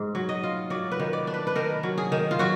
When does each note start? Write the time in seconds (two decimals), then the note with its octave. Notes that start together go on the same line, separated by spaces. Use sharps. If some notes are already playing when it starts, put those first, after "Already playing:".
Already playing: G#2
0.15 F#3
0.29 D#5
0.43 F4
0.70 F#3 D5
0.91 B4
0.99 D#3
1.13 D5
1.27 D4
1.34 B4
1.47 B4
1.55 D#3 A#4
1.83 F#3
1.98 G#4
2.12 D#3
2.31 F4
2.39 F#3 F#4